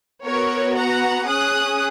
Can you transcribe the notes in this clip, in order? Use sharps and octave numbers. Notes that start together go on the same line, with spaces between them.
B3 F#4 A#4 C#5
F#5 A#5
C#4 G#4 D#6 F#6